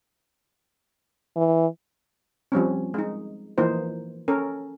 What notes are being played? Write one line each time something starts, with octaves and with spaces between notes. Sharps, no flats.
E3
F3 G3 C4 C#4
G#3 D#4
E3 F3 A#3 D#4 C5
C#4 A4 A#4